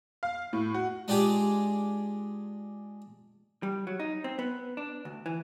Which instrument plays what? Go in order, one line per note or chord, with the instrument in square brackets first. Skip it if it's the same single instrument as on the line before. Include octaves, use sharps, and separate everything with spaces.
[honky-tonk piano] F5
A2
F#4
[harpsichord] G#3 D4 F4 G4 G#4
[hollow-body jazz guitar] G3
F#3
D#4
C4
B3
D4
D2
E3